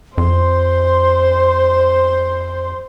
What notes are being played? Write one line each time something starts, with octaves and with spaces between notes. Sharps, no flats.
F2 C5 C6